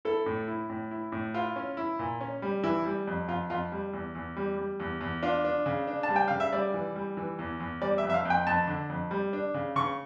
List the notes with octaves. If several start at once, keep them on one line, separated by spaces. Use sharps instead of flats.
E4 A4
A2
E4
A2
E4
A2
E4 F4
C#4
E4
A#2
C#4
G3
E3 E4
G3
F2
F2 F4
F2 F4
G3
E2
E2
G3
G3
E2
E2
D4 F4
D4
C#3
D4
A5
G3
G5
C#3 F5
E5
G3 D5
E3
G3
E3
E2
E2
G3 D5
E5
F2
E5
F5
F2
G5
F2 A5
D3
F2
G3
D4
C#3
C#3 C#6